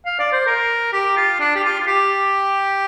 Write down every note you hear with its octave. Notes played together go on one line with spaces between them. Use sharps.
F5
D5
C5
A#4
G4
F4
D4
G4
F4
F4
G4